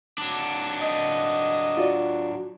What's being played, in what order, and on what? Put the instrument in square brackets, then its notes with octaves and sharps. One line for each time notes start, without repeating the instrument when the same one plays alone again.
[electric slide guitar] F#3 D4
[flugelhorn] D#5
[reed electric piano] F4 F#4 D5